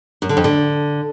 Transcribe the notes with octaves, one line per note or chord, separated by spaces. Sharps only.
F#2
D3
F2
D3